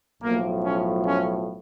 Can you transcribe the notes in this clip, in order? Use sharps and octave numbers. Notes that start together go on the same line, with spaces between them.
B1 A2 F3 A#3
C#4
C#4